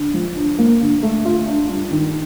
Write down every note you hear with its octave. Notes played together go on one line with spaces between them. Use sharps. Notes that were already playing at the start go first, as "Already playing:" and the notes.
Already playing: D3
F3
D4
A#3
D3
A3
F4
D4
G2
D#3